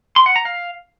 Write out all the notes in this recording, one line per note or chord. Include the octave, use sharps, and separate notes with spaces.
C6
F#5
A#5
F5